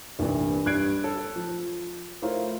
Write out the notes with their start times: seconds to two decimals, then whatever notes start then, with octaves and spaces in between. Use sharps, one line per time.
0.19 C2 G2 A#2 E3
0.66 G2 G3 F#6 G#6 C7 D7
1.04 A4
1.36 F3
2.22 A3 E4 F4 A#4 C5 C#5